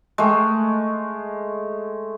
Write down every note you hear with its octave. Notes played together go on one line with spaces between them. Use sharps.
G#3 A3